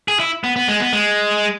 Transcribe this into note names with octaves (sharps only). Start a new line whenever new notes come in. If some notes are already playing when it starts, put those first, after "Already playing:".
G#4
E4
B3
B3
G#3
B3
G#3